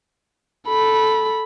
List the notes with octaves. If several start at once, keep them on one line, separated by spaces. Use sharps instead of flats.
A4 B5